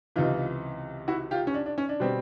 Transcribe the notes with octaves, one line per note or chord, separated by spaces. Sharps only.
C#2 C3 E3 D#4 F4
E4 F#4
F4 G4
C#4
D4
D4
C#4
D4
B2 G3 C4